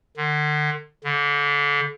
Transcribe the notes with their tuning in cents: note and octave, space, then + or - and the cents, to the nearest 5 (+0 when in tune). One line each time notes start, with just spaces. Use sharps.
D3 +35
D3 -30